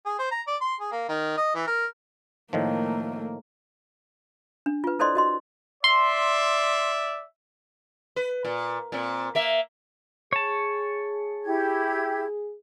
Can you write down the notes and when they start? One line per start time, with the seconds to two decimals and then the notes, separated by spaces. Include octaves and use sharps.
0.06 G#4
0.19 C5
0.31 A#5
0.47 D5
0.61 C6
0.80 G#4
0.92 A#3
1.09 D#3
1.37 D#5
1.55 E3
1.67 A#4
2.53 A2 D#3 F3 A3 A#3
4.66 D4
4.84 F4 B4
4.99 E4 A4 C5 D5 D#5 C6
5.15 F#4 D#5 C6
5.84 D5 E5 C6
8.16 B4
8.45 A#2
8.92 A#2 C4
9.35 A#3 E5
10.33 G#4 C#5 A5
11.45 E4 G4 G#6